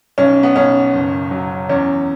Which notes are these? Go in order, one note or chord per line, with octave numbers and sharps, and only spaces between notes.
B1 C#4
B3
B1 C#4
F#1
F#3
E2 C#4